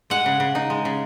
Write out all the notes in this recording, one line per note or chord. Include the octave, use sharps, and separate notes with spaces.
G#3 F#5
C#3
C#3
D#4
G#3
C#3